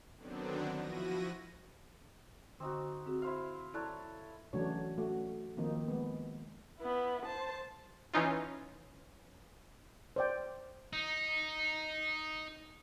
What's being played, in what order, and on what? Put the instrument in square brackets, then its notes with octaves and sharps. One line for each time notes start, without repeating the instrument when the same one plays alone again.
[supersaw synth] D3 D#3 F#3 B3 C4 D4
F3 E4 F#4 A#6 D#7
[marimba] D3 [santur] C4 D#4 F#4
[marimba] C4 F#4 G#4
[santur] E4 C5 F5
[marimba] E4 D5 F#6 [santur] A4 C#5 A#5
[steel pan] C#3 E3 F#3 A3 D4 C#5
A3 F#4
D#3 F3 A#3 C4 D#4
G#3 B3
[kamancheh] B3 E4
C5 A5
[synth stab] E3 C#4 D#4 F4
[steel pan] C5 D5 G5
[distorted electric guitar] D#4